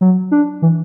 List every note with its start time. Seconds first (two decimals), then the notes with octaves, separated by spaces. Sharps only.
0.01 F#3
0.31 D4
0.62 E3